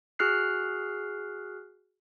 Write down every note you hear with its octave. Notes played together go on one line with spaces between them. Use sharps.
F#4 G#4 F6 F#6 C7